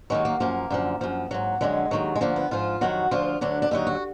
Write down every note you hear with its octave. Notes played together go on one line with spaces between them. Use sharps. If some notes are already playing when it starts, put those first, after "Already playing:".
D#2 D#3 F#3 G#3
A#3
F#2 F3 A#3
F#2 D3 F3
F#2 F3
G#2 F#3
F2 D3 F#3 G#3
D#2 D#3 F#3
G#3
D2 D3 F3 A#3
B3
G#2 F3 F4
F2 D#3 F#3 F#4
D2 D3 F3 F4
D2 D3 F#3 D4
D4
D#2 D3 F#3 D#4
F#4